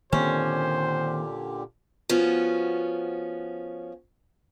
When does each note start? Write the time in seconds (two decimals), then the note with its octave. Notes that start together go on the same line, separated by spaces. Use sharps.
0.12 A#2 D3 D#3 A#3 C4 C#4 G4 C5
2.09 F3 B3 C#4 F#4